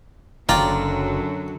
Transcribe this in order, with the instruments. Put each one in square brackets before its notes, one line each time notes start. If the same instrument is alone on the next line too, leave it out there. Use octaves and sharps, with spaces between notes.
[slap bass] F#1 [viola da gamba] F#2 D3 F#3 [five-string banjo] F4 [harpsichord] D5 G5 A#5